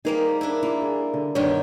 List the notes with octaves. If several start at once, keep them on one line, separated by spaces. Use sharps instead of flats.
G3 A#3 D#4 G#4 A#4 C5
D4 E4
A#3 E4
G#4
D3
G2 B2 D#3 D4 C#5